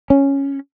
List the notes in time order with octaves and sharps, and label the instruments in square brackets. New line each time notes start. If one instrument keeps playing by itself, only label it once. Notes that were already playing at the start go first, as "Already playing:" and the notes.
[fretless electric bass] C#4